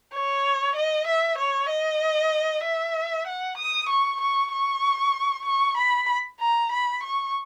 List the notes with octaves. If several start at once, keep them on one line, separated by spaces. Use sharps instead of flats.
C#5
D#5
E5
C#5
D#5
E5
F#5
D#6
C#6
C#6
C#6
C#6
B5
A#5
B5
C#6